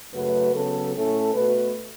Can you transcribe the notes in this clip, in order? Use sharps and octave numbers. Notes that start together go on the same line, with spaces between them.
F#2 C#3 A3 F#4 B4
C#3 F#3 B3 A4
A2 A3 C#4 A4
B2 A3 F#4 B4